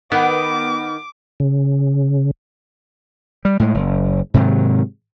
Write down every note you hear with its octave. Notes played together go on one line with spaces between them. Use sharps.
D#3 B3 D6
C#3
G3
A2 G#3
F#1
G#2 C3 D#3 F#3